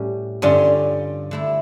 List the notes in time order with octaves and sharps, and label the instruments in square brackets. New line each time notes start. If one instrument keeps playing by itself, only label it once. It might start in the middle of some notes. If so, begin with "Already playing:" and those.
Already playing: [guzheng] A2 G3 C#4
[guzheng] G2 D3 G3 C#4 F4 [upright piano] D5
[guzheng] D3 A3 E4